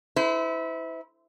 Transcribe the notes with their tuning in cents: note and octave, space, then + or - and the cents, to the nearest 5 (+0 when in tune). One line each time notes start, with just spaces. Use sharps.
E4 -20 C5 -40